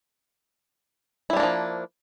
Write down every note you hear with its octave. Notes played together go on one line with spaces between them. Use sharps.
F3 G3 A#3 D4 E4